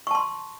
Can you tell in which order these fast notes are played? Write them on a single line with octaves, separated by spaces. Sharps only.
C#6 A5 C6